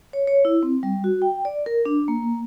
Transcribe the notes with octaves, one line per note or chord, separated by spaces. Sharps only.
C#5
C#5
E4
C4
G3
F#4
G5
D5
A#4
D4
A#3